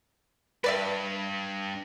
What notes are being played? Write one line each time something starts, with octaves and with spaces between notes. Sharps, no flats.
G2 B4 D5 E5